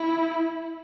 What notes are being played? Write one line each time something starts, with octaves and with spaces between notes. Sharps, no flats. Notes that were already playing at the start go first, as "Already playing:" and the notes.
Already playing: E4